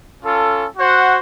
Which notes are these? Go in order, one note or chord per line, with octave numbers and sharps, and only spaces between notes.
C#4 F4 A4
F#4 C5 F#5